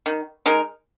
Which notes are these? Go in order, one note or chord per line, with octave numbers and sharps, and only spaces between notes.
D#3
G#3 D#4 A#4